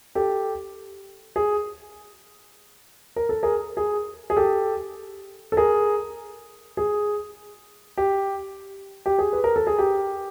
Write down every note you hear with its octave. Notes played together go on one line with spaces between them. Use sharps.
G4 A4
G#4
A#4
A4
G#4 A#4
G#4
G#4
G4 A4
A4
G#4 A#4
G#4
G4
G4
G#4
B4
A#4
A4
G#4
G4